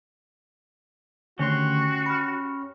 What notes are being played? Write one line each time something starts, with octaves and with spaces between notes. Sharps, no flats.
D3 D#3 A3 C#4 F#4 G4 C6
B5 F6